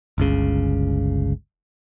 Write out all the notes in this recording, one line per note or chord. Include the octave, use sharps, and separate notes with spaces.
G1 C#2 C#3